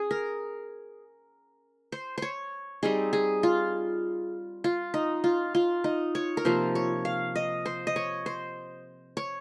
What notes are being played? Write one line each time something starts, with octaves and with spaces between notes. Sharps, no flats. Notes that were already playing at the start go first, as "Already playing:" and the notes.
Already playing: C#4 G#4
A#4
C5
C5 C#5
G3 C4 D#4 G#4
G#4
F4
F4
D#4
F4
F4
D#4
C#5
A#4
C3 F3 A#3 C5
C#5
F5
D#5
C5
D#5
C#5
C5
C#5